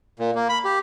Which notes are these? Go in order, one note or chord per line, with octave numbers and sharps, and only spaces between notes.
A#2
A#3
B5
G4